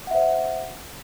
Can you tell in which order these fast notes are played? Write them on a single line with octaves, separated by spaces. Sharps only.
F#5 E5 C5